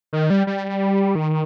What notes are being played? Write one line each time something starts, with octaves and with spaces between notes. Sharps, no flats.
D#3
G3
G3
D#3